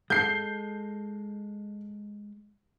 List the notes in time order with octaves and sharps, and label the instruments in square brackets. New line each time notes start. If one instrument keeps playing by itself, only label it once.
[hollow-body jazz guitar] G#3 A4 [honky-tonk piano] G6 C7